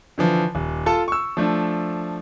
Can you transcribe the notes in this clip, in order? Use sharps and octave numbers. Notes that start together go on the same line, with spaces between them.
D3 E3 F3
D#1
F4 A4 A5
C#6 E6
F3 A3 D4